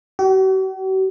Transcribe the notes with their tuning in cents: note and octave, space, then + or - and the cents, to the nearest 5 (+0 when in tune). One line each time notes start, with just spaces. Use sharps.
F#4 +45